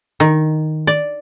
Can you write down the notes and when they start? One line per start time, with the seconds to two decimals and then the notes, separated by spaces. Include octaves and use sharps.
0.20 D#3
0.87 D5